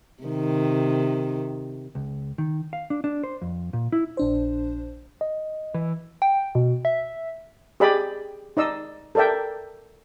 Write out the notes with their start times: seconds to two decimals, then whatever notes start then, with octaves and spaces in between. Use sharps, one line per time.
0.23 C3 D#3
1.95 C#2
2.38 D#3
2.73 F5
2.90 D4
3.04 D4
3.23 C5
3.42 F2
3.73 A#2
3.93 E4
4.17 A#1 D4 C5
5.21 D#5
5.74 E3
6.22 G5
6.55 B2
6.85 E5
7.80 G4 G#4 D5 D#5 B5
8.57 D#4 D5 D#5 E6
9.15 A4 A#4 D5 E5 G5